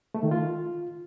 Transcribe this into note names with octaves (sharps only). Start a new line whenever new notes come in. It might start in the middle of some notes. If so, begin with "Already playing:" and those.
A3
D#3
F4